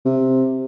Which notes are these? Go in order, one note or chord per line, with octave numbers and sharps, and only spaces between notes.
C3